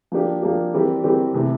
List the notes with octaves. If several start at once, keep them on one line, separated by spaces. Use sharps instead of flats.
F3 A#3 D4 G4
F3 A#3 D4 G4
E3 G3 C4 G4 A#4
E3 G3 C4 G4 A#4
C3 E3 A3